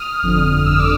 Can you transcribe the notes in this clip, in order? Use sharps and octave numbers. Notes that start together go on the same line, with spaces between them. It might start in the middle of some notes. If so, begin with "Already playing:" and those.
Already playing: D#6 F6
G1 F2 D3
G1 F2 D3 E6 F6
D6 E6